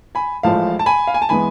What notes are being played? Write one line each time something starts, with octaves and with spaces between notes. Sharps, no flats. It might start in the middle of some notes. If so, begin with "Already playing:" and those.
G#5 B5
A1 A2 F3 G#3 F5 A5
A5
G#5 B5
F5
G#5
A5
E3 G#3 B3 G#5 B5